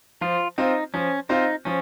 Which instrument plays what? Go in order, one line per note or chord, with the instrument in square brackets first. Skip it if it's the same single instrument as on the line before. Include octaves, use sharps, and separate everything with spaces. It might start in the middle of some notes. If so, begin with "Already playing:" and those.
[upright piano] F3 [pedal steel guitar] F4
[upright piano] C4 F4 C5 [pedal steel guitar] D#4
[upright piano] F3 [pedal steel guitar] C#4
[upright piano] C4 F4 C5 [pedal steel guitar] D#4
[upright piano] F3 [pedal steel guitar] C#4